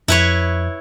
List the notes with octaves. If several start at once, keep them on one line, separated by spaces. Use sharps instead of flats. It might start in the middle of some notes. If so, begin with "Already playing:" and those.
F2 E4 B4 C#5